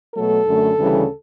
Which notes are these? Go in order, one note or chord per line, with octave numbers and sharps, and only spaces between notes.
B2 F#3 A3 A4
F#2 D3 A3
D2 C#3 E3 G3